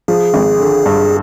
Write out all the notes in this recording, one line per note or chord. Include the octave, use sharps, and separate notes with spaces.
F3 G#4
G#1
D3
G2